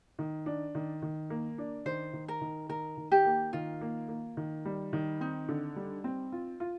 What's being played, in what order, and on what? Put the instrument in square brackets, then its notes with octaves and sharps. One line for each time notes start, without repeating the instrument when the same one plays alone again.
[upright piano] D#3
D4
D#3
D#3
A#3
D4
[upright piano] D#3 [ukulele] C5
[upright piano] D#3
[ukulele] A#4
[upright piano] D#3
[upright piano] D#3 [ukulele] A#4
[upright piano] D#3
[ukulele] G4
[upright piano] A#3
[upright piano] D#3 [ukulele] F4
[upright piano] A#3
A#3
D#3
G3
D#3
[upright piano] C4 [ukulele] D#4
[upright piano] D3
G3
C4
F4
F4